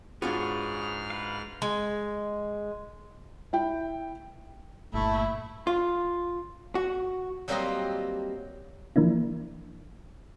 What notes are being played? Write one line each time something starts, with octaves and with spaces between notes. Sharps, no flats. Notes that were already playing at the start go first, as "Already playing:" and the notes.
G#2 D4 F4 F#4 G#4 B4 C#5 F6
B4 F5
G#3
E4 G5
G1 A#2 A3 E4
F4
F#4
F#3 G3 A#3 C4 C5 D#5
E3 F3 A#3 D4 E4